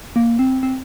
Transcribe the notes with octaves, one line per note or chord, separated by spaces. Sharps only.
A#3
C4
C4